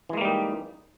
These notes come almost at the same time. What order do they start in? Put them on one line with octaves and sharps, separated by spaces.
E3 G#3 A#3 G3 D#4